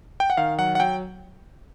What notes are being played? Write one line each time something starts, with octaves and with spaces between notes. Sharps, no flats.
G5
F#5
D#3 F5
F#3 F#5
F#5
F#3 G5